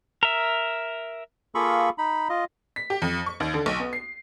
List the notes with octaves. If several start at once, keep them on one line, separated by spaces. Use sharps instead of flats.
A#4 E5
A#3 F4 G#4 A4 B5 C#6
D#4 B5
F4 D#5
B6
G4
F2
C#6
D#2
D3
B1
B3
C7